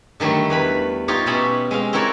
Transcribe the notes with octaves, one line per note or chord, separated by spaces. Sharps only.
D3 D#3 F#3 G3 A3
E2 B4 B5
D#4 F4 G4 C#5
B2 B3 C#4 E5 B5
G#3 C4 F5
C4 E4 F#4 A#4 C#5 D5